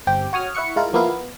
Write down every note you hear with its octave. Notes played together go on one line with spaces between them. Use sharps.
G1 C4 G4 G5
F#4 C#5 D#6 F6
E4 E5 F#5 C#6 C#7
G#3 E4 F4 A#4
F3 A#3 B3 E4 F5
B3